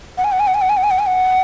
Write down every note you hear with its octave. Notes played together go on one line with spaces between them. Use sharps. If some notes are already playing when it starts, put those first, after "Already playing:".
F#5
G#5
F#5
G#5
F#5
G#5
F#5
G#5
F#5
G#5
F#5
G#5
F#5